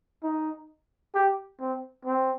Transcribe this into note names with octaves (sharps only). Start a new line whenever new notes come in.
D#4
G4
C4
C4